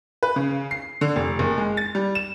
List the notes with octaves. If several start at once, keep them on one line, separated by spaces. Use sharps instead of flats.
B4
C#3
C7
D3
F1
F#1
G#3
A6
G3
E7